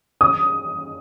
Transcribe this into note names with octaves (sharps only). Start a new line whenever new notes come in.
D#6